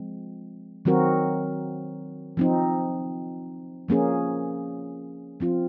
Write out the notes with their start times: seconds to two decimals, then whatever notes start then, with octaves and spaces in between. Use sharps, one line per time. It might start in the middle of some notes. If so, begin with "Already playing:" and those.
Already playing: F3 G#3 C4
0.85 D#3 F#3 C4 F#4 A#4
2.37 F3 C4 D#4
3.88 F3 A#3 C#4 G#4
5.40 F3 C4 F4